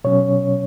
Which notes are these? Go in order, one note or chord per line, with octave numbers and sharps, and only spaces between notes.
B2 F#3 C#4 C#5